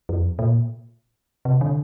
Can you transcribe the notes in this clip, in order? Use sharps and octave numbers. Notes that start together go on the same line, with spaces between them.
F2
A#2
C3
D3